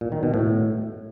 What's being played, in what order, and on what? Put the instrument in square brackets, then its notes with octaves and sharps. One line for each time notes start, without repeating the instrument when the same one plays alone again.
[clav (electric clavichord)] A#2
D#3
B2
A2